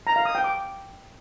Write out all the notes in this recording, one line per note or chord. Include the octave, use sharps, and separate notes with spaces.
A#5
F5
D#6
G5
D6